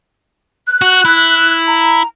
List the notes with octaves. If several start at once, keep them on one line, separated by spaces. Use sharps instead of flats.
F#6
F#4
E4
A#5